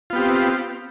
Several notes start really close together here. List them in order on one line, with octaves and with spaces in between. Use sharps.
F4 B3 G4 C4